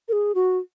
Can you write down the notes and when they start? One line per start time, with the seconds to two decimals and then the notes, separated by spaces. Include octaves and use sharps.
0.09 A#4
0.13 G#4
0.35 F#4